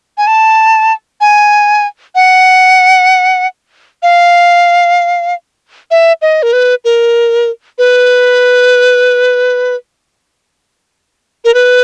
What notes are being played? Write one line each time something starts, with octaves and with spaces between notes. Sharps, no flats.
G#5
A5
G#5
F#5
F5
E5
D#5
A#4
B4
A#4
B4
A#4
B4